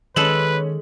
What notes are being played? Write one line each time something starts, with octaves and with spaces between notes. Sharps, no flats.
D#3 G#3 C#4 A4 B4 F#7